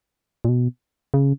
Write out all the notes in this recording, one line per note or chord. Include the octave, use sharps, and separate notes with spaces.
A#2
B2
C#3